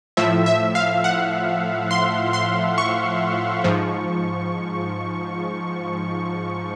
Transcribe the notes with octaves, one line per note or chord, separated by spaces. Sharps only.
A2 F3 E5
E5
F5
F#5
C6
C6
C#6
G#2 F3